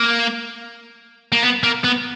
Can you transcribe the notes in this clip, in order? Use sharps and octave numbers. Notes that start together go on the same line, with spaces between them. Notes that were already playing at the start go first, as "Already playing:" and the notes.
Already playing: A#3
A#3
B3
A#3
B3